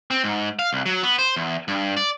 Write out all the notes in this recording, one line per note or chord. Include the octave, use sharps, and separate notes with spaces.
C4
G#2
F5
C2
F#3
B3
C5
E2
G2
D5